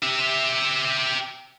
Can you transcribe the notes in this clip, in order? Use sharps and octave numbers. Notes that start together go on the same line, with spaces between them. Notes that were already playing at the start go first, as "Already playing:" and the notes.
G4 E5